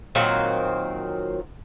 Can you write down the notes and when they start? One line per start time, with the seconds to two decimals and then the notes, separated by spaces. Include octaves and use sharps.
0.15 A#2 D#3 F#3 C4